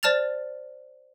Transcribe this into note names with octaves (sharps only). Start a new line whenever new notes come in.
C5 D5 A5 F6 A6 F7